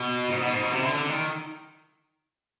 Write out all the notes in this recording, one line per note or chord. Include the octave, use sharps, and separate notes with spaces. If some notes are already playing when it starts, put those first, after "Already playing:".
Already playing: B2
G#2
B2
G#2
B2
C3
D3
D3
D#3